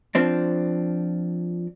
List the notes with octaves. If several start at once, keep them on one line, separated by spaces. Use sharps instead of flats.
F3 C4 D4